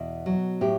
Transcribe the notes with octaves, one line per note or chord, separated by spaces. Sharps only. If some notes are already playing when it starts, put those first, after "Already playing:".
Already playing: E2 B2
F#3
A2 G4